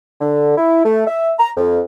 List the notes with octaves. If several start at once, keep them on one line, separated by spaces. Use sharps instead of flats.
D3
E4
A3
E5
A#5
F2